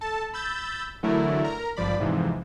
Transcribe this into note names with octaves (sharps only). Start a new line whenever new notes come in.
A4 A5
B5 E6 G6 A6
D3 E3 F#3 A3 E4 A#4
A#4 A#5
G#1 G2 F3 D5 B5
F2 G#2 C3 E3 F3